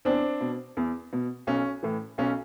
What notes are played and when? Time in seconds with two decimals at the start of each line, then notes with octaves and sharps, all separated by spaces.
0.05 E2 C4 D4
0.41 B2
0.77 E2
1.13 B2
1.47 B1 C#4
1.83 A2 E3
2.18 B1 C#4